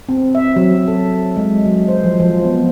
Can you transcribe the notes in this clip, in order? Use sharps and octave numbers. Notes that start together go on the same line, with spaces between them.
C4
E5
F#3
A4
G#3
F#3
C5
F3
F3
B3